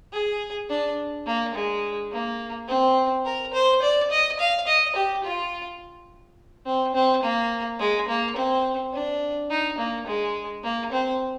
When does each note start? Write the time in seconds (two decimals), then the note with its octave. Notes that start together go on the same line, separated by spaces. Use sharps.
0.12 G#4
0.70 D4
1.26 A#3
1.55 G#3
2.12 A#3
2.68 C4
3.25 A#4
3.53 C5
3.82 D5
4.11 D#5
4.39 F5
4.67 D#5
4.96 G4
5.24 F4
6.66 C4
6.94 C4
7.23 A#3
7.79 G#3
8.08 A#3
8.36 C4
8.93 D4
9.50 D#4
9.78 A#3
10.07 G#3
10.63 A#3
10.92 C4